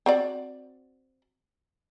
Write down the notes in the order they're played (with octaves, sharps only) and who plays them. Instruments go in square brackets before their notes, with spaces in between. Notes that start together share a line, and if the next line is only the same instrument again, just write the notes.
[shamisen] C4 F#4 D5